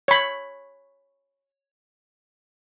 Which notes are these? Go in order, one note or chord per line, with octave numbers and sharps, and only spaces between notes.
C#5 B5